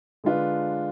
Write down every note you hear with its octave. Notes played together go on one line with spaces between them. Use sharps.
D3 G#3 D4 F4 B4